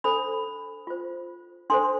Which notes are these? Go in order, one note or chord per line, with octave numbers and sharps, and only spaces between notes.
D4 A4 C5 B5
F4 C5
D4 A4 C5 C6